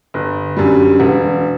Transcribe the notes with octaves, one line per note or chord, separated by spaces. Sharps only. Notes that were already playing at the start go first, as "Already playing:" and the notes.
G1
F#2 D3 G3
E1